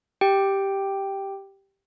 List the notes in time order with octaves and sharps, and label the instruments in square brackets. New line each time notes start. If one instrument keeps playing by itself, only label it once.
[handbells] G4 G5